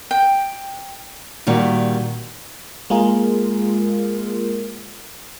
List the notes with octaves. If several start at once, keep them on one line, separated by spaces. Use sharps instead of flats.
G5
A#2 D#3 G3 F#4
G#3 A#3 F4 G#4 A#4